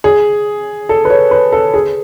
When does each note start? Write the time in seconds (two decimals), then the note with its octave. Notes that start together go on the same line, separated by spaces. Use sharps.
0.04 G#4
0.89 A4
1.05 B4
1.10 C#5
1.31 B4
1.52 A4
1.74 G#4